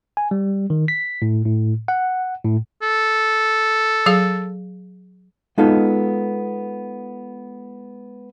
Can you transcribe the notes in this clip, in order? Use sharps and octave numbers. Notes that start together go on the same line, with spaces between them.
G#5
G3
D#3
B6
A2
A2
F#5
A2
A4
F#3 G#4 F5
G#3 B3 D#4 F4 A4 F5